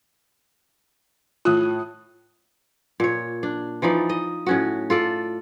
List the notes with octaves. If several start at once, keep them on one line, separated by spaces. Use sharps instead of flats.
A2 F4 D#6 F#6
A#2 C#5
D4
E3 F3 D#4 D5
D#5
A2 C#4 F#4
F4 A4 D5